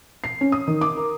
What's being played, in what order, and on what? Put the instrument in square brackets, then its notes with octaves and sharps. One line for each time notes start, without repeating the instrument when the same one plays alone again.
[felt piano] C7
C#4
D#6
D#3
D6
A#4